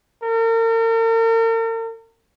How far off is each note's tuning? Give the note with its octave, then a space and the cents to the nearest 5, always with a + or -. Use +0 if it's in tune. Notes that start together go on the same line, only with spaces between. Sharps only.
A#4 -40